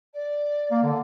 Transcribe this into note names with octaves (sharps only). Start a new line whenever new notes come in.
D5
A#3
D3